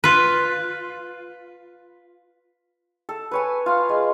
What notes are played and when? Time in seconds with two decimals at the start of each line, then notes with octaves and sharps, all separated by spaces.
0.04 F4 B4
3.09 A4
3.31 B4 C#5 G#5
3.66 F4 F5
3.89 G#3